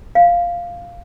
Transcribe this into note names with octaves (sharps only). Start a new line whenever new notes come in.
F5